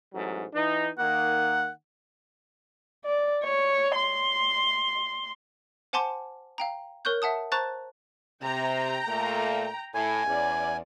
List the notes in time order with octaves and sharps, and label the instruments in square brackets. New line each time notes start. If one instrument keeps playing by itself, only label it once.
[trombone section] A1 G#2 F#3
E3 D#4
[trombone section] D#3 A#3 [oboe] F#5
[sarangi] D5
C#5
C6
[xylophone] C5 F#5 G#5 A5 C6 D6
F5 G5 A#5
A#4 C#5 C#6 F#6 G6
E5 F#5 A5 D#6
C5 A5 A#5 C#6 F#6 A6
[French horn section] C3 [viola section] G5 A#5
[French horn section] A#2 A3 A#3
[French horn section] A2 [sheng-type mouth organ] G#5
[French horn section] E2 [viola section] C#4 D5